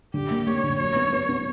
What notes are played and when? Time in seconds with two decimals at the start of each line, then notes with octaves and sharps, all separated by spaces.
0.14 D3 G4
0.30 A#3
0.46 A#3 C#5
0.64 D3
0.79 F#3 C#5
0.96 B3
1.12 B3
1.29 B3